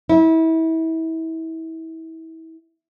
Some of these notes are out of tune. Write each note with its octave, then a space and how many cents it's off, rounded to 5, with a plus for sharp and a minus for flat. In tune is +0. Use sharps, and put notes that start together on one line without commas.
E4 -30